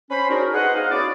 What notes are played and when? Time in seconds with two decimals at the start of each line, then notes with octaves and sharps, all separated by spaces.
0.10 C#4 C5 B5
0.30 D4 D#4 F#4 G#4 A#4
0.54 G#4 B4 C5 D#5 F#5
0.75 B3 D#4 D#5 F5
0.91 C#4 E4 F#4 G#4 D5